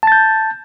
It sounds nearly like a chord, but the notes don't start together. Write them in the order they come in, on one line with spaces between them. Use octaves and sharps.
A5 A6 G6